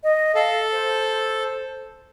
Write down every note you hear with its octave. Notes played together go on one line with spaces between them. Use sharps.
D#5
A4 F5
C5